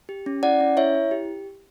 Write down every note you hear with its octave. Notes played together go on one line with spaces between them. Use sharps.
G4
C#4
E4 D5 F#5
C#4
E4 C#5 E5
E4
G4